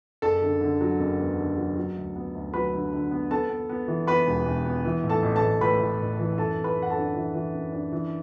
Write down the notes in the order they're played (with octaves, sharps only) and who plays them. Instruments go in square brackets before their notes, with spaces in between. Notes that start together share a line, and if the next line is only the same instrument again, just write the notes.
[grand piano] F#1 A4 A5
D3
D3
F#3
F#1
E2
D3
F#3
F#3
D2
B3
D2
F#3 B4 B5
D3
D3
B3
B3 A4 A5
B3
B3
E3
B3 B4 B5
E1
E1
B3
E3
A2
A4 A5
A1
A4 A5
A1
A2 B4 B5
A2
A1
E3
F#2 A4 A5
F#2
B4 B5
F#2
F#5
A4 A5
D4
E3
E3
F#2
D4
E3